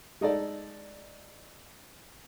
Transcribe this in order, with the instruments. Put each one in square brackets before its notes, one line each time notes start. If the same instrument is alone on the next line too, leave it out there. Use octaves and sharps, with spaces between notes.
[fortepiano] G#3 D#4 A4 D5